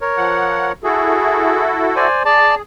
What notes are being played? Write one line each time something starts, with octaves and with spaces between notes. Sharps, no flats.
A#4 C#5
F3 F#5
E4 F#4 G#4 A4
C5 D5 G#5
G#4 D5 A5